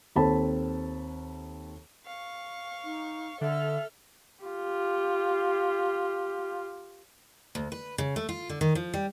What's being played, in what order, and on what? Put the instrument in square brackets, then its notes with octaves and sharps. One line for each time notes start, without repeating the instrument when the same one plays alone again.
[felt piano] D#2 C4 A4 A5 B5
[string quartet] F5 C#6
[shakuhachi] D#4
[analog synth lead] D3 [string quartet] A4 F6 [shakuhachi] E5
[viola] F4 G4
[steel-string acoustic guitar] D2
B4
C#3
A3
F4
D3
D#3
F3
G3